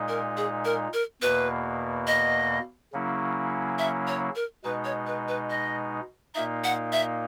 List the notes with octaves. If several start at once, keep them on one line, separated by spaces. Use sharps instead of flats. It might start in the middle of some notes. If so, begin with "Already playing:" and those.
Already playing: A#2 G#3 D#4
A#4
G#4
A#4
A#4
E2 B2 A#3 B4
D#5
C#3 F#3 A#3 C#4 E4
E5
C#5
A#4
B2 G#3 D#4 B4
C#5
B4
B4
D#5
A#2 A#3 D#4 E5
F#5
E5